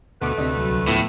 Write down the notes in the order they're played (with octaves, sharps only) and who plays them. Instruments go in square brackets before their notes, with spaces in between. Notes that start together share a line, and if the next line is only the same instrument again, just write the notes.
[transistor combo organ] D2 B2 [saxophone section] A3 B4 [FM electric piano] F#5 D6
[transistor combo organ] D2 [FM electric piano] C3 D4 D#5
[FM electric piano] C2 F#3
[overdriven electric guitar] A2 [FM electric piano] F3 B3 E6